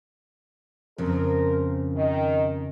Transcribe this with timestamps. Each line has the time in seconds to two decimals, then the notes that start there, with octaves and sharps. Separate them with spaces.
0.98 F2 C#3 A#4 C5
1.95 D#3